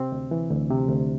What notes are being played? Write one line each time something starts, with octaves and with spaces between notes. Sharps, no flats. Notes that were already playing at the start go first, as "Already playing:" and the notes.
Already playing: C3 C4
D2
E3
D2
C3
D2